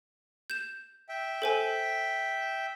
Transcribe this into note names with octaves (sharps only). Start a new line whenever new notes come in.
G6 E7
E5 G5
A4 C5 G#5